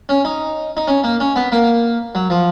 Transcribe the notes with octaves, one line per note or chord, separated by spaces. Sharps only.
C#4
D#4
D#4
C#4
A#3
C#4
B3
A#3
F#3
F3